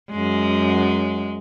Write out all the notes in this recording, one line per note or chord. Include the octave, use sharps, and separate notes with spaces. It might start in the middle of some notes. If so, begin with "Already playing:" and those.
F#2 G#3